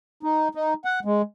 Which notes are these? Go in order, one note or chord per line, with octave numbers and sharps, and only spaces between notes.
D#4
D#4
F#5
G#3